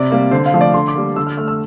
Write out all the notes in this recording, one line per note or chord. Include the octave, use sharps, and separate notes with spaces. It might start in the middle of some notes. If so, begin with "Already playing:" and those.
Already playing: C3 D5
G3 A#3
D3 C5
F5
F3 A3
D5
D3 C6
D6
G3 A#3
D3 E6
F6
A3 F6
E6